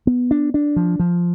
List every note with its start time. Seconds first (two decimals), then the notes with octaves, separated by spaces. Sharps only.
0.07 B3
0.31 D4
0.54 D4
0.76 F3
0.99 F3